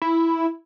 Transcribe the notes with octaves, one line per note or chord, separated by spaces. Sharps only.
E4